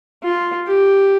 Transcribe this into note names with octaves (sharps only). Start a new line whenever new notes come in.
F4
G4